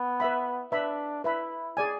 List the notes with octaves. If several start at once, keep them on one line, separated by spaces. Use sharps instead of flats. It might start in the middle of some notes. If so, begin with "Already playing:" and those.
Already playing: B3
B4 E5 B5
D4 B4 E5 B5
E4 B4 E5 B5
G#4 D5 G#5